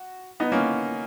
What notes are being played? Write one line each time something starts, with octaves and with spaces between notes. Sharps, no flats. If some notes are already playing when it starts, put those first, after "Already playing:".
Already playing: F#4
B3 D#4
A#3 C#4